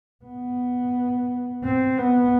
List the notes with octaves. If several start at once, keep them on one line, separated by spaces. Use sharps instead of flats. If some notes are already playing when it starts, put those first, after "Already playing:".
B3
C4
B3